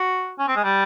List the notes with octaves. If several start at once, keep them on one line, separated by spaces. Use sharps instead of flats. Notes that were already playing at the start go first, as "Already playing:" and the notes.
Already playing: F#4
C#4
C4
G#3
G3